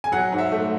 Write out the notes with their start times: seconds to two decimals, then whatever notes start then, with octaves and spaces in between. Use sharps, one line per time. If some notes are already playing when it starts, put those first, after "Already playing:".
0.04 G#5
0.12 F#3 F#5
0.32 G#2
0.38 E5
0.51 A3